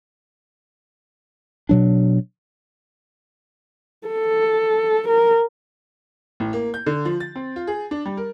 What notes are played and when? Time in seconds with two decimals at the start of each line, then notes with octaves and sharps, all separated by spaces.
1.69 B2 F#3 D4
4.07 A4
5.08 A#4
6.40 A1
6.53 A#3
6.74 G6
6.86 D3
7.05 F3
7.20 A6
7.36 C4
7.56 F4
7.67 G#4
7.91 D4
8.06 G3
8.17 A#4